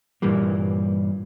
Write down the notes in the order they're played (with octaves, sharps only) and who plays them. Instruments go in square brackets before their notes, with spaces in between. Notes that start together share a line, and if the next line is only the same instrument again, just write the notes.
[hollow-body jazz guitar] G2 A#2 E3 G3 A#3